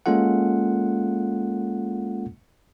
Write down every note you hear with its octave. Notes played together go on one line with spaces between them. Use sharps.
G#3 A#3 C#4 F4 A4 F#5